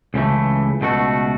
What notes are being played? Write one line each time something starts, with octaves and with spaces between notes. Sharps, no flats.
C#2 C#3 E3 A3
C#2 B2 A3 F#4